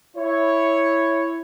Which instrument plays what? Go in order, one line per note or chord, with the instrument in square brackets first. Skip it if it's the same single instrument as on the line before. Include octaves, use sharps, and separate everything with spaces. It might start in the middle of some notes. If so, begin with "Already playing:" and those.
[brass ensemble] E4 C#5